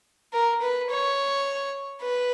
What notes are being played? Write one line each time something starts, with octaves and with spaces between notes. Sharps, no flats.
A#4
B4
C#5
B4